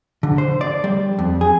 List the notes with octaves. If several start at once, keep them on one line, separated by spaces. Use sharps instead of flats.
D3
C5
D5
G3
F2
G#4